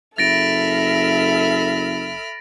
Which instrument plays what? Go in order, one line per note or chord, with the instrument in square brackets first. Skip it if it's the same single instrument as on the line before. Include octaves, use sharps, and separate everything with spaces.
[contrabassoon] F#1 [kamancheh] A4 E5 [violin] B5 F6 [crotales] A6 A#6 D7